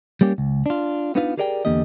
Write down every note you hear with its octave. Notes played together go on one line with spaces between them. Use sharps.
G3 A#3 C#4 G4
C#2
D4 F4
B3 D4 D#4 F4 B4 F5
G4 G#4 A#4 D5 F#5 G5
E2 D3 A#3 G4 D#5